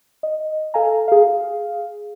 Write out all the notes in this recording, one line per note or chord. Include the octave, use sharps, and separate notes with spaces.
D#5
A4 F5 G#5 A#5
G#4 F5